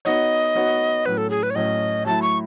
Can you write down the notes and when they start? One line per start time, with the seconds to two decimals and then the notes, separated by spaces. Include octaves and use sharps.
0.05 B3 D#4 F#4 C#5 D#5
0.55 B3 D#4 F#4 C#5
1.05 A2 F#3 C#4 B4
1.17 A4
1.30 G#4
1.43 B4
1.50 C#5
1.55 A2 F#3 C#4 D#5
2.06 F#3 A3 E4 A5
2.22 C#6